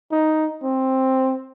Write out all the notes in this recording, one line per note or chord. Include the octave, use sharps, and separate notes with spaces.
D#4
C4